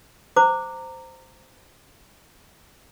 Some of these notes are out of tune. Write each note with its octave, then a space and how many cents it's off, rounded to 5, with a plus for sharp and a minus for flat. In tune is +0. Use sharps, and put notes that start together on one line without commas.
C5 -10 A#5 -20 D6 +0